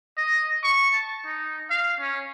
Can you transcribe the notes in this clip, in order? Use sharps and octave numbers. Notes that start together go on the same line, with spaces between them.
D#5
C#6
A5
D#4
F5
C#4